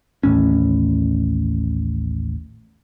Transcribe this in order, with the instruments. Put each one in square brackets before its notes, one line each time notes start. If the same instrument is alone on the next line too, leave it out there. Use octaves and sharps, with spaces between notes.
[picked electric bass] A1 D#2 A2 C#4